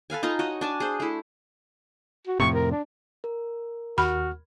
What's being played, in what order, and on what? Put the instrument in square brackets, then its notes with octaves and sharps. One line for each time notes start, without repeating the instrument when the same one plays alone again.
[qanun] A4 B4 F5 G#5
D#4 F4 A#5 C6
F#4 C#5 D#5
D4 G#5 A5
G#4 C5
A3 E4
[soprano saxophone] F#4
[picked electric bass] F2 A2 C3 [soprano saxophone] C#6
[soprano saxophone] A#4
D4
[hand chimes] A#4
[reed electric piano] D#2 F6 [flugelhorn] F#4 [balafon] B5